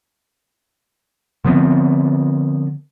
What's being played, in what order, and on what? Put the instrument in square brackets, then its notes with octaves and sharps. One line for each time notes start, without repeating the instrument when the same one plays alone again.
[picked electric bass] D3 F3 B3 C4